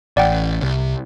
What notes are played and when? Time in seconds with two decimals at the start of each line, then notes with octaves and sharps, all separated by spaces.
0.17 A1 D5 F#5 G5
0.62 C2